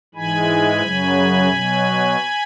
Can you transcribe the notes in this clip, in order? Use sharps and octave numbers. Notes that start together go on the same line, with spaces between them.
G#2 E3 G#3 G#5 B5
F#2 C#3 F#3
B2 F#3